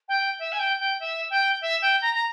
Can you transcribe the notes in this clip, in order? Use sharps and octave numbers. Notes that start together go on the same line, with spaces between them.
G5
E5
G#5
G5
G5
E5
G5
E5
G5
A#5
A#5